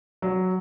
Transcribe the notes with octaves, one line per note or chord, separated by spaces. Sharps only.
F#3